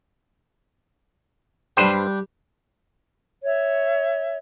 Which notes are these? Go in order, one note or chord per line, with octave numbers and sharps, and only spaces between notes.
G2 G3 D4 G4 B4 C5
C#5 E5